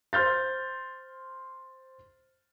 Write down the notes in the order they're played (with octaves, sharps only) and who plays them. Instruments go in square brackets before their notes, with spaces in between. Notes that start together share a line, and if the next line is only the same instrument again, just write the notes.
[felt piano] C5 C6 F6 G6 A6